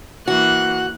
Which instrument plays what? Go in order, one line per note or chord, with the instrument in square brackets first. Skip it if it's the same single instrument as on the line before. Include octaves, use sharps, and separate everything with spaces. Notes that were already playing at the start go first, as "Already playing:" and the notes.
[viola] E3 A#3 [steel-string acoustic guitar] F#4 [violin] F#6